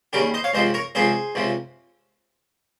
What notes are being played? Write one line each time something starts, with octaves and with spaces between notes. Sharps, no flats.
D#2 C#3 G3 G4 A#4
C5 D#5
C#5 F5
C#2 C3 F3 C5 D#5
A#4 C#5
C#2 C3 F3 G#4 C5
C#2 C3 F3